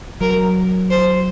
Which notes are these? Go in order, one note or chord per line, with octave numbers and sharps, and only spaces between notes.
F#3 A#4
C5